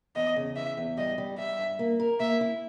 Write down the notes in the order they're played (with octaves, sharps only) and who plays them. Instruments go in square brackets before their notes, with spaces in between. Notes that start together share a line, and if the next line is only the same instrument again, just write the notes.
[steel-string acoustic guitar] E2 [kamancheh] D#5
[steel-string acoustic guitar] C#3
[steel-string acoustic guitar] E3 [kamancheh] E5
[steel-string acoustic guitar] E2
[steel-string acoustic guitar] G3 [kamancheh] D#5
[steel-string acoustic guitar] G3
[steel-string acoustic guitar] G3 [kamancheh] E5
[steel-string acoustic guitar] G2
A#3
A#4
[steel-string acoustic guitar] A#3 [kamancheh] E5
[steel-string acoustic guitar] E4